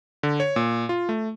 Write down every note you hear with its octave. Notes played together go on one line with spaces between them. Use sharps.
D3
C#5
A#2
F4
A3